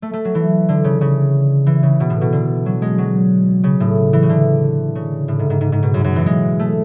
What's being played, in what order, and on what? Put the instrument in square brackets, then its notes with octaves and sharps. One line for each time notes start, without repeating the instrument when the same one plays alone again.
[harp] A3
A3
F#3
E3
D3
C#3
C#3
E3
C#3
B2
A2
B2
D3
F#3
G#3
F#3
C#3
A2
E3
C#3
D3
C#3
A2
G#2
G#2
G#2
G#2
B2
F#2
F#2
E3
G#3
A3